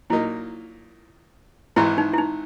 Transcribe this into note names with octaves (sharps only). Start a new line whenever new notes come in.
A#2 F#3 A#3 D#4 E4
G#1 G#2 E3 E4
D#4
E4
D#4